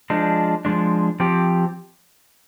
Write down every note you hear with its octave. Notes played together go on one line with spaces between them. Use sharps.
F3 G#3 D4
F3 G#3 D4
F3 C4 G4